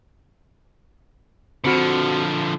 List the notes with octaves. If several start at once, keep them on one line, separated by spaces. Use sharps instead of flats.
D3 F3 C4 F#4 B5 F6 C#7